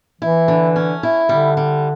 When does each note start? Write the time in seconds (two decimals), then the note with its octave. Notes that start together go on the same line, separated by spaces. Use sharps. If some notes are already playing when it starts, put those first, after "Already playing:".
0.22 E3 E4
0.48 D3
0.76 C#4
1.03 E4
1.29 D3 G3
1.57 G3